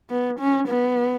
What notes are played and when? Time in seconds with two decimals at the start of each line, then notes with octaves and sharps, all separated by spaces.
0.10 B3
0.40 C#4
0.68 B3